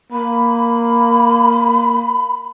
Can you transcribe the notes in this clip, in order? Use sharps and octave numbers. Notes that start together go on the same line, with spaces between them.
A#3 B5